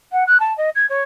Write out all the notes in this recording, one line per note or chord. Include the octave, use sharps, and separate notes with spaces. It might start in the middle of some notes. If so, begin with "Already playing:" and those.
F#5
F#6
A5
D#5
G#6
C#5